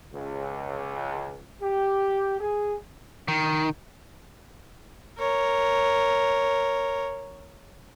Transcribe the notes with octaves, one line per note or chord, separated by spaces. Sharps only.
C#2
G4
G#4
D#3
A#4 C#5